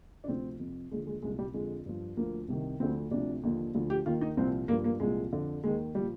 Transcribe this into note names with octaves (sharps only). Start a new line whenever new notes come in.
D4
D2 C3 F3 C4
F2 C3 F3
D#2 D3 F3 G#3
G#3
C2 A#2 F3 G#3
G3
F2 D3 F3 G#3
G2 F3
D2 D3 F3 A#3
C2 C3 D#3
D2 D3 F3 C4
D2 C3 F3 D4
D#2 D3 F3
D2 D3 F3
G4
D#2 D#3 F4
D#4
C2 A#2 F3 C4
G2 F3 A#3
A#3
C2 A#2 F3 G#3
F2 D3 F3
D#2 D#3 G#3
A#2 F3 G3